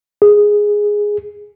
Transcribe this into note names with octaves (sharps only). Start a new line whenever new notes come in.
G#4